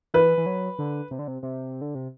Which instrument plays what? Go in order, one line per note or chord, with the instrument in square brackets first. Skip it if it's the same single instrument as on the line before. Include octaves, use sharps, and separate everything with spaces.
[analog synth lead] E3 [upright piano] B4
[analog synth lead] E3
F#3
D3
C3
D3
C3
C3
D3
C3